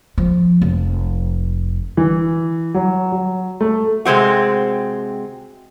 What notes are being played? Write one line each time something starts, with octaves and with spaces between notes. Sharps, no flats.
F3
F1
E3
F#3
F#3
A3
C3 G#3 C4 F#4